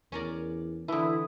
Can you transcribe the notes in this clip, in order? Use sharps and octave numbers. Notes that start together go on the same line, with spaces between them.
E2 C#4 A#4 D5
D3 E3 E4 A5 D#6